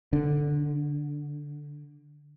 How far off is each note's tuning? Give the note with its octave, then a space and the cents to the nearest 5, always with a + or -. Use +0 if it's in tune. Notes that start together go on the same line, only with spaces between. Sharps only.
D3 +0